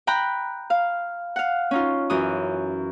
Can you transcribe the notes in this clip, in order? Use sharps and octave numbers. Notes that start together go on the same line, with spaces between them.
G5 A#5 B5 F#6
F5
F5 F#5
C#4 D#4 F4
F#2 E3 D#6